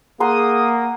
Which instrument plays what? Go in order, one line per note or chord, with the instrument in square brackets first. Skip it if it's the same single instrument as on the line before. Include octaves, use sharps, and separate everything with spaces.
[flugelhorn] A#3 [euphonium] G#4 [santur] F#5 A#5 C6 [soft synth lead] D#6